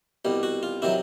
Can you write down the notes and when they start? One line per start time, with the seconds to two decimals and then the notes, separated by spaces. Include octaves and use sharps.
0.25 C2 B2 G3
0.43 F#4
0.63 F4
0.82 C3 D#3 F#3 E4